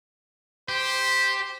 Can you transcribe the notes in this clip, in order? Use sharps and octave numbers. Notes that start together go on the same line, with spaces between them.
G4 C5